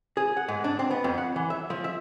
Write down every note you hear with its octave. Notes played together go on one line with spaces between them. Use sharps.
G#4
F#5
G#2
D4
C4
B3
F2
F#5
E3
E5
F3
E5